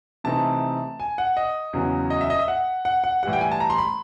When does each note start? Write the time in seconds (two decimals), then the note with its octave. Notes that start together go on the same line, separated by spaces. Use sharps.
0.24 C3 E3 A3 C4 D#4 A5
1.00 G#5
1.18 F#5
1.37 D#5
1.73 E2 C#3 F#3
2.10 D#5
2.21 E5
2.30 D#5
2.39 E5
2.48 F#5
2.85 F#5
3.04 F#5
3.23 A2 E3 G3 F#5
3.33 G5
3.41 G#5
3.51 A5
3.60 A#5
3.70 C6
3.78 B5